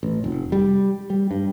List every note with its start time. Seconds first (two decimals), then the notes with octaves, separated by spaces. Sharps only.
0.03 A1
0.24 F1
0.52 G3
1.10 G3
1.31 G2